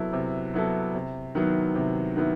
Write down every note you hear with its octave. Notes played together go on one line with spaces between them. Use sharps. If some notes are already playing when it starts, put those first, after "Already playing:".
Already playing: C3 F#3 B3 E4 A4
C3
F#3 B3 E4 A4
C3
D#3 F#3 B3 E4
C3
D#3 F#3 B3 E4